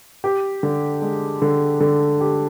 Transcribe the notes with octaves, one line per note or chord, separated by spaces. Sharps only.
G4
D3
G#3
D3
D3
G4